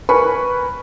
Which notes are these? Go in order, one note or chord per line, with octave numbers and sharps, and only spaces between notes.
A#4 B4 G#5 B5 C#6